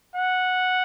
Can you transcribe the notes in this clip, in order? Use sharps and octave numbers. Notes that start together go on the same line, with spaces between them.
F#5